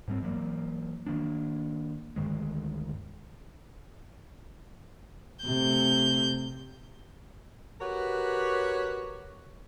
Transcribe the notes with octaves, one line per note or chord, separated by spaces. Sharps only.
G#2 G3 C4
E3 F#3 A3 A#3
D#3 A#3 D4
D2 G2 D#3 G#3
C3 A3 G6
F#4 G4 A#4 B4 C#5